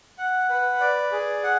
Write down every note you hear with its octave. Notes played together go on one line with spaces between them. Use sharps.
F#5
B4
D5
G#4
F#5